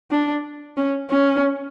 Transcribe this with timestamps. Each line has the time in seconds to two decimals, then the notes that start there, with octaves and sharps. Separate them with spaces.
0.11 D4
0.77 C#4
1.10 C#4